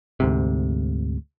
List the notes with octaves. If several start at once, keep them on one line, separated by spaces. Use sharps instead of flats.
D2 G#2 C3